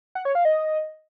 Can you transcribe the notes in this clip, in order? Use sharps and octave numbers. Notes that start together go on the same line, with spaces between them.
F#5
C#5
F5
D#5